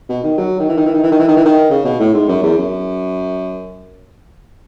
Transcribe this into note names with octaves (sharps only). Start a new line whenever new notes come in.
B2
D#3
F#3
D#3
E3
D#3
E3
D#3
E3
D#3
E3
D#3
E3
D#3
C#3
B2
A2
G#2
F#2
E2
F#2